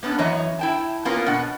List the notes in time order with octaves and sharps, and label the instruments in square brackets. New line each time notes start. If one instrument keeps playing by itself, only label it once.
[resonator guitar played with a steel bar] A#3 B3 C#4 D4
F#2 E3 C#5 D#5 A#5
E4 G5 A5
A#3 B3 C#4 F4 A#4 B4
B2 D4 F#5